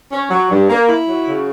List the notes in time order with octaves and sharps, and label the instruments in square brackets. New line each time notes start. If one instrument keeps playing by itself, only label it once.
[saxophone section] C#4
F#3
G2
A#3
E4
F#3
C#3